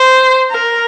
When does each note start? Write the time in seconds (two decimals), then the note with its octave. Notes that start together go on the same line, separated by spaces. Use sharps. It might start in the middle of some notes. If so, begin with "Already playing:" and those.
Already playing: C5
0.51 A#4